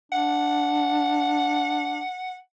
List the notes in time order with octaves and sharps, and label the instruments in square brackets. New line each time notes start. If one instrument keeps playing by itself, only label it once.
[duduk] D4 [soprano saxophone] F#5